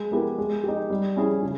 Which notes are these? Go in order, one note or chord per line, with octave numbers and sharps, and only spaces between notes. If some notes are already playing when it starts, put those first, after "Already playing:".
Already playing: G#3
B3 E4 G4 A#4
G#3
D#4 G4
G3
C#4 E4 G#4
C#3